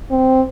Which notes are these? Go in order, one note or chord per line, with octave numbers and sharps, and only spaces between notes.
C4